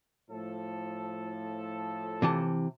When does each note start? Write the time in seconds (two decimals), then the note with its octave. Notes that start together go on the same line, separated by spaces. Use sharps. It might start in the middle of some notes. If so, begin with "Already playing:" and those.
0.30 A2 F3 A4
2.22 C3 E3 A5